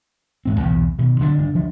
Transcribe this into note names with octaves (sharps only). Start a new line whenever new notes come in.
D#1 G#2 C4
B1 E2 A#2
B2 D#3
D3 F#3 C4 D4
F#1 G2 D4
D2 F3 F#3 D4